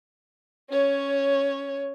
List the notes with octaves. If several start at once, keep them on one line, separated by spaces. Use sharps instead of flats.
C#4 C#5